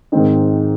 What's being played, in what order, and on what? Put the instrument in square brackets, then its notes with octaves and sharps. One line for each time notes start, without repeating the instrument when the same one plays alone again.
[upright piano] G#2 D#3 G#3 C4 D#4